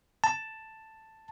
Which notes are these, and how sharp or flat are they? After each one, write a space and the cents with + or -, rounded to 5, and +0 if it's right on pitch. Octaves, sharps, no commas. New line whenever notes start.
A5 +5